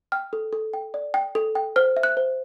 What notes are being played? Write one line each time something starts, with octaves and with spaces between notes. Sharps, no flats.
G5 F6
A4
A4
G5
D5
G5
A4
G5
C5 F6
E5
F#6
C5